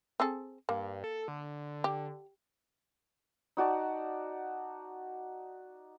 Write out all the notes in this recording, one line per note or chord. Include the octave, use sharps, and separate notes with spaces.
C4 G#4 A4
G2 A#3
A4
D3
G4
D#4 F#4 D5 A5